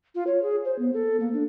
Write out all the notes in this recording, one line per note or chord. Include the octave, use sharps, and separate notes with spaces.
F4
C#5
G#4
C5
B3
A4
A#3
D4